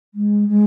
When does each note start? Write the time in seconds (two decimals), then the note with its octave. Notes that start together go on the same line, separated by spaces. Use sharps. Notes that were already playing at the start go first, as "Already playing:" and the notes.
0.14 G#3
0.49 G#3